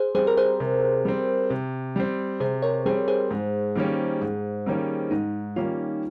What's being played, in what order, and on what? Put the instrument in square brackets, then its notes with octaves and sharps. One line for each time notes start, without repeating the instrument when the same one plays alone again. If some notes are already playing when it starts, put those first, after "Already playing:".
Already playing: [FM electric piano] G#4 C5
[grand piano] G3 C4 [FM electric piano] G#4 C5
[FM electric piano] A#4
G#4 C5
[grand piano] C3
G3 C4
C3
G3 C4
[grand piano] C3 [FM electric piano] G#4 C5
[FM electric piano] A#4 C#5
[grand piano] G3 C4 [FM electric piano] G#4 C5
[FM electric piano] G#4 C5
[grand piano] G#2
D#3 G3 A#3 C#4
G#2
D#3 G3 A#3 C#4
[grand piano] G#2 [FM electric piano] D#4
[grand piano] D#3 G3 A#3 C#4 [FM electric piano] F4